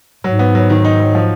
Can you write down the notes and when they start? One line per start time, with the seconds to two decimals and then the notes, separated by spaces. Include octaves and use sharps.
0.24 G#2 F#3
0.39 B3
0.55 F#3
0.70 D#3
0.85 D#4
1.00 F#3
1.15 F3